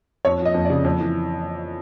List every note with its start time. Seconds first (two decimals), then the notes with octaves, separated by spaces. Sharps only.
0.25 F2 C#5
0.40 F3
0.45 D#5
0.54 F2
0.65 D5
0.70 C#3
0.85 F2
1.00 E3